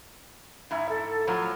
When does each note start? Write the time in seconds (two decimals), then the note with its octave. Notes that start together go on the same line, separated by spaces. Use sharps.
0.71 G#2 E4 E5
0.89 A4
1.27 A2 F3 F#3 A#5